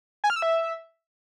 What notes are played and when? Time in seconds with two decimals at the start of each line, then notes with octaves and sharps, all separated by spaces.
0.24 G#5
0.30 F6
0.36 E6
0.42 E5